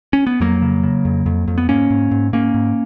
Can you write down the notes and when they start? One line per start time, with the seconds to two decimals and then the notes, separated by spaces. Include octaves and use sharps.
0.13 C#4
0.27 B3
0.40 F2 F#3 A#3
0.62 C#3
0.83 C#3
1.05 F2
1.26 F2
1.48 F2
1.58 B3
1.69 G#2 A#3 C#4
1.90 G#2
2.11 G#2
2.33 G#2 A#3 C#4
2.54 G#2